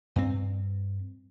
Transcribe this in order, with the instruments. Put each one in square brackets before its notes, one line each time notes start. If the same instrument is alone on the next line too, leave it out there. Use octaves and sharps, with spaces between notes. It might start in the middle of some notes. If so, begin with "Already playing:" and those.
[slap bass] G2 C4